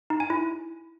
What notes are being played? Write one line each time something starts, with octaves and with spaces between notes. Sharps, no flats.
D#4
G#5
E4